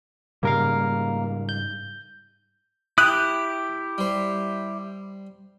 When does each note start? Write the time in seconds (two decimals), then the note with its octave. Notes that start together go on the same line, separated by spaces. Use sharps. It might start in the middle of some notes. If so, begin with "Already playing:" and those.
0.43 G#2 C#3 G3 A#3 A#4 F5
1.49 G6
2.98 E4 G4 A5 D#6 F#6
3.98 G3 C5